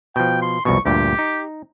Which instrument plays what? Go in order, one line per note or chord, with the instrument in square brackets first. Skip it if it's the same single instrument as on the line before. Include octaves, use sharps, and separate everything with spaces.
[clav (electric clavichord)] B2 F3 [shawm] G5
[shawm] C6
[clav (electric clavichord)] C2 F2 B2 [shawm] C#6
[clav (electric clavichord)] D2 G2 A#2 [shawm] G4
[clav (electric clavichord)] D#4